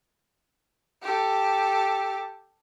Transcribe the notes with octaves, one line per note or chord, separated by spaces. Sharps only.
G4 A4